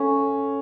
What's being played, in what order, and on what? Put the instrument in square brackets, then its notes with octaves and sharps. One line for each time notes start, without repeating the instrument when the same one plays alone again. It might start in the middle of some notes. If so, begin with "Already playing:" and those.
Already playing: [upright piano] C#4 [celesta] A4 F5 G#5 C#6